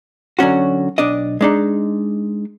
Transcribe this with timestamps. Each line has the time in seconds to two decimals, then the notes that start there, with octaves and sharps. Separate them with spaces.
0.39 D3 F#3 C#4 F#4
0.98 B1 D4 D5 D#5
1.41 G#3 D4 D#4